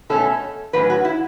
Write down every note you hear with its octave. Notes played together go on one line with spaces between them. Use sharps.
B2 A3 C#4 A4
A2 F#3 C#4 B4
F#4
E4